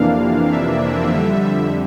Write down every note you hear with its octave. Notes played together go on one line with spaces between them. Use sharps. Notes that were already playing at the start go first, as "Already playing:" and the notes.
Already playing: F2 C3 E3 A#3 D4 F5
E5
F2 D3 G3